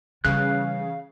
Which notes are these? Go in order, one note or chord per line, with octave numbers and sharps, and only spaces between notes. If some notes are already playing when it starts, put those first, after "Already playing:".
C#3 E3 G3 F5 F#6